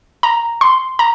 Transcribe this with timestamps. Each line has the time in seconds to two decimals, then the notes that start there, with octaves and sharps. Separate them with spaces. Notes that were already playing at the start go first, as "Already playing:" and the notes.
0.23 A#5
0.61 C6
0.99 A#5